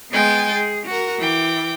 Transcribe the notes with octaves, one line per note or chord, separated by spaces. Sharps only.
G#3 B3 G5 G#5 A6
G#4
F#4 A#4
E3 G5 D6